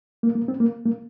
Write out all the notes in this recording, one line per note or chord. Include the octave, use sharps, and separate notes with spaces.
A#3
A#3
C4
A#3
A#3